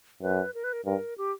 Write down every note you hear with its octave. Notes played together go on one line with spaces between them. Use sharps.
F#2 B4
A#4
B4
A#4
G2 A#4
G4